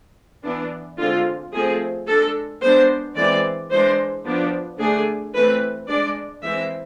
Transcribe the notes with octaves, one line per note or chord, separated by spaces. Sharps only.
E3 B3 D4
D3 G#3 C4 F4
F3 A3 C4 G#4
G#3 D4 A4
G#3 B3 D4 C5
E3 G#3 C4 D5
E3 G#3 D4 C5
F3 B3 D4
D3 A3 D4 G#4
E3 A3 C4 B4
G#3 D4 D5
E3 G#3 C4 E5